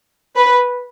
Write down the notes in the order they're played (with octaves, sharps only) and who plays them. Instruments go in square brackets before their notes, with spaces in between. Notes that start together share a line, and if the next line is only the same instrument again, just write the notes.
[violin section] B4